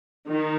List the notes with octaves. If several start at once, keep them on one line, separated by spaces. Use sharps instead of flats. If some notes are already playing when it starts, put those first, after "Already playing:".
D#3